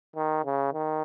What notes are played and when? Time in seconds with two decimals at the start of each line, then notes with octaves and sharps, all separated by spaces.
0.16 D#3
0.45 C#3
0.73 D#3